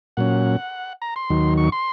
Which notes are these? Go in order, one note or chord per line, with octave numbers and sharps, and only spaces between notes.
A#2 F#3 C#4 F#5
A#5
C6
D#2 D#3 F#3
C#6
C6